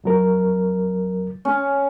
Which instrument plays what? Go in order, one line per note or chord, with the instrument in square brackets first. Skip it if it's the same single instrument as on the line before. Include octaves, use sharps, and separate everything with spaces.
[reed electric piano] F2 F#3 A#4
[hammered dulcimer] C#4